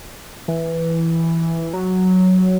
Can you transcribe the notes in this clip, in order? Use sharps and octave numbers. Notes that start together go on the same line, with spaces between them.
E3
F#3